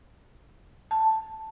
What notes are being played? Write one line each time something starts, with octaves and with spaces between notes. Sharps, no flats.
A5